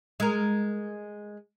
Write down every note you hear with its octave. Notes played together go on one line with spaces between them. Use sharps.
G#3 A#4